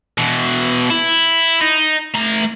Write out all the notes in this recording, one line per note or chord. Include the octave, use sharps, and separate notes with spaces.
B2 E3
E4
D#4
A3 A#5